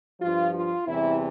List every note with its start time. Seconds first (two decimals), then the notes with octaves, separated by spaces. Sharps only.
0.21 G2 F3 F4
0.54 F4
0.87 E2 C3 E3 G3 E4